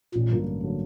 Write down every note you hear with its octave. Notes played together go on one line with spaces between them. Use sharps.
A1 A#2
G2 D3 F#3 A#3
A1
D3 F#3 A#3